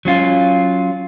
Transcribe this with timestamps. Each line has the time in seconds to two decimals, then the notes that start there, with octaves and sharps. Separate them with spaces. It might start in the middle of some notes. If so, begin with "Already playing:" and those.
0.05 F#3 C#4 F4